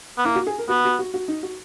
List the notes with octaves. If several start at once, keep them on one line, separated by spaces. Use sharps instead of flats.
B3
A#3 E4
F#4
G#4
A#4
B3 F#4
F#4
F#4
F#4
D#4
F#4